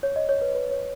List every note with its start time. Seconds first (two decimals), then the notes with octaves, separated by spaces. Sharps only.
0.03 C#5
0.16 D#5
0.29 C#5
0.41 B4
0.55 B4
0.71 C#5